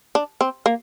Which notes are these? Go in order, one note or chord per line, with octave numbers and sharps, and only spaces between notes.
D4
C4
A#3